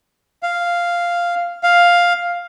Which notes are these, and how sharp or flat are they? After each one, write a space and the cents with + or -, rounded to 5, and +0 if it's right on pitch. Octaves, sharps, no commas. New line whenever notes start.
F5 -5
F5 +5